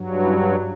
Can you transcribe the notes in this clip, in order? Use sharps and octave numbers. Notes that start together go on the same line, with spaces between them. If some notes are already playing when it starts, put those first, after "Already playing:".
Already playing: G2 F#3
C#4 E4